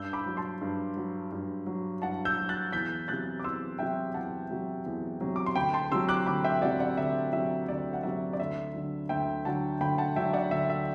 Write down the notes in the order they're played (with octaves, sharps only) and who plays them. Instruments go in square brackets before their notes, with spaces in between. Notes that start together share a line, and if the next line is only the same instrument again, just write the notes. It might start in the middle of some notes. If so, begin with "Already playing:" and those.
Already playing: [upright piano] G2 E6 G6
B5 D6
F#3
A5 C6
G2
F#3
G2
F#3
G2 F#5 A5
E6 G6
F#3
F#6 A6
E2 G6 B6
C3 F#3 F#6 A6
D6
E2 C6 E6
C3 F#3 E5 G5
E2 F#5 A5
C3 F#3
E2
C3 F#3
D6
C6
D2 G5 B5
A5 C6
C3 F#3 C6 E6
D6 F#6
D2 B5 D6
E5 G5
C3 F#3 D5 F#5
D5 F#5
D2 E5
C3 F#3 E5
D2 D5
F#5
C3 F#3 E5
D5
D2 E5
D3 F#3
D2 E5 G5
D3 F#3 F#5 A5
D2 G5 B5
F#5 A5
D3 F#3 E5 G5
D5 F#5
D2 E5
E5